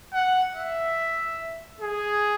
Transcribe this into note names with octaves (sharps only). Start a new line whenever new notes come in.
F#5
E5
G#4